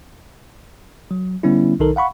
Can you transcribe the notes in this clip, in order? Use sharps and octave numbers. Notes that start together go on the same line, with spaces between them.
F#3
D3 G3 B3 C#4 E4
B1 D#3 D#4 A4 A#4
F5 F#5 B5 C#6